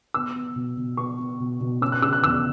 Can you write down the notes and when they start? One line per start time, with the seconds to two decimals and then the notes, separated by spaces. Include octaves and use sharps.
0.14 B3 E6
0.36 B3
0.56 B2
0.77 B2
0.97 B3 C#6
1.19 B3
1.40 B2
1.61 B2
1.81 C#4 E6
1.92 F#6
2.02 C#3 E6
2.13 F#6
2.23 E2 E6